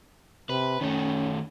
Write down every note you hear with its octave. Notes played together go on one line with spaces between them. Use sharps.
C3 B4
D#3 A3 C#4